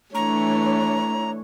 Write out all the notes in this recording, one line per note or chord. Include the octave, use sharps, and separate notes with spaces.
E3 A3 D4 C#5 A#5